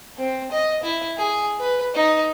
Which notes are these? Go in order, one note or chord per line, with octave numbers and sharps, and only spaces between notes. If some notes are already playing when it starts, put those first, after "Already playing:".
C4
D#5
E4
G#4
B4
D#4